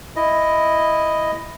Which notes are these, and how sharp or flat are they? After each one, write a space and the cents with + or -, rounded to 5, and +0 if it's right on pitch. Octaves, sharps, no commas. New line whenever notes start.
E4 +0 D#5 +0